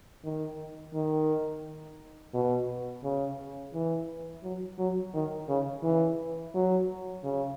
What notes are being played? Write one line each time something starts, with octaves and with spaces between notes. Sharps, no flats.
D#3
D#3
B2
C#3
E3
F#3
F#3
D#3
C#3
E3
F#3
C#3